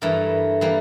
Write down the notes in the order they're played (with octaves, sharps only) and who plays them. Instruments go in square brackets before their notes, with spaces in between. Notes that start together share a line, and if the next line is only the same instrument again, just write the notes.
[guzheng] G2 E3 A3 A#4
E3 G3 A#3